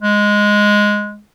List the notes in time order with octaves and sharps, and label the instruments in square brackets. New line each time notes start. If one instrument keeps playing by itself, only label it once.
[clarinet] G#3